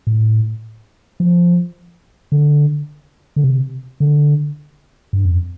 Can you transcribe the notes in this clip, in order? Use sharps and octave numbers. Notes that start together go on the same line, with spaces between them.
A2
F3
D3
D3
C3
D3
G2
F2